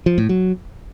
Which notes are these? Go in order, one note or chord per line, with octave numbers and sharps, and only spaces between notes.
F3
A2
F#3